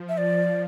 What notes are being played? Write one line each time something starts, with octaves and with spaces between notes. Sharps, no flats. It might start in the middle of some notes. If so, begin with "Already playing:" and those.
Already playing: F3
E5
D5